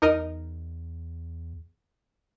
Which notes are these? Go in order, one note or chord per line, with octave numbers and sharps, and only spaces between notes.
E2 D#4 A#4 D#5